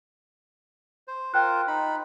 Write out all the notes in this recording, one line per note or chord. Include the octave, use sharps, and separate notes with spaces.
C5
F4 A#4 C5 G5 F#6
D#4 B5